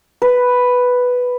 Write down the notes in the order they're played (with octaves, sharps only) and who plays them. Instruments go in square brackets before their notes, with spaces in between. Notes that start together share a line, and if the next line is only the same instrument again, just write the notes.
[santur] B4